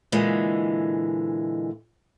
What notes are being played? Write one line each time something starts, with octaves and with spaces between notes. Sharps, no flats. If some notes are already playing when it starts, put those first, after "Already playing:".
A#2 D3 E3 G#3